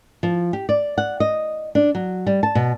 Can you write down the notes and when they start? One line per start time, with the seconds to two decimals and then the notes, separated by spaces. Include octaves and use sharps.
0.23 F3
0.53 G4
0.69 D5
0.98 F#5
1.20 D#5
1.75 D4
1.95 F#3
2.27 G3
2.43 A5
2.55 B2